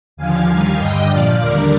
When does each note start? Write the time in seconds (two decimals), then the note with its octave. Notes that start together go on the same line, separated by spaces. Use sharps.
0.17 D#2 D3 F3 F5 G#5
0.47 D#2 D#3 G3 F5 G#5
0.78 G2 D3 G3 D#5 G5
1.09 A#2 F3 D5 F5
1.40 D#2 D3 G3 A#4 D5